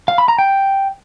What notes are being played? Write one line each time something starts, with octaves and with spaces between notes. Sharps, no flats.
F5
B5
A#5
G5